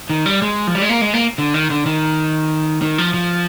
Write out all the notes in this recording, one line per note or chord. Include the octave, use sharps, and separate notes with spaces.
D#3
G3
G#3
F3
G3
G#3
A#3
G#3
A#3
D3
D#3
D3
D#3
D#3
F3
F3